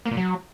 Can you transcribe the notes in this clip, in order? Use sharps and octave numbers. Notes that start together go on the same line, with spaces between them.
A#3
A#2
F#3